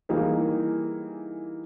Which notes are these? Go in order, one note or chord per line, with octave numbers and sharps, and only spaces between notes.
E3 G3 A#3 D#4 G#4 A#4